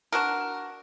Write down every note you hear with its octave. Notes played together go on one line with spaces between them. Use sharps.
D4 F#4 A#4